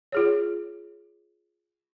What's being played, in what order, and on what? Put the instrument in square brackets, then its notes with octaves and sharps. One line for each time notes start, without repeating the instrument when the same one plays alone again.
[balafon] F4 G#4 C#5